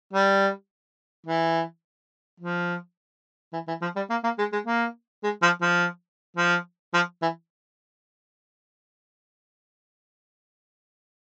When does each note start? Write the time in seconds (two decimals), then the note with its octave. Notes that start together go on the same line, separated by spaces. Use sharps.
0.13 G3
1.26 E3
2.40 F3
3.53 E3
3.68 E3
3.82 F3
3.96 G3
4.10 A#3
4.24 A#3
4.38 G#3
4.52 G#3
4.67 A#3
5.23 G#3
5.42 F3
5.61 F3
6.37 F3
6.94 F3
7.22 E3